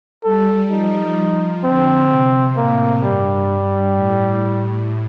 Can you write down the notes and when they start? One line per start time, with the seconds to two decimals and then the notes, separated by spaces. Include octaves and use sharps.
0.24 G3 A4
0.71 F3 D#4
1.64 D3 C4
2.10 C3
2.56 A2 A#3
3.03 G2 G3
3.95 A2